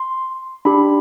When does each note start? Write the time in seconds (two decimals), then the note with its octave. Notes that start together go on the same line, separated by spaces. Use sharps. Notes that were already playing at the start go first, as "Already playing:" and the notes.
Already playing: C6
0.65 D4 G4 B5